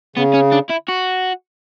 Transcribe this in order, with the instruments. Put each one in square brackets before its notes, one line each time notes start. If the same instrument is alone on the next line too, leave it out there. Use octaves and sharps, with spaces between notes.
[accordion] C#3 [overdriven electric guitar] B3
[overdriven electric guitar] C#4
D4
E4
F#4